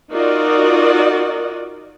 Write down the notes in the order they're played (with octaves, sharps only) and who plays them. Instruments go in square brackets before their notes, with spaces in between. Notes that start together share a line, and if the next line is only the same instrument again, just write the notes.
[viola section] D#4 F4 F#4 A#4 D5 D#5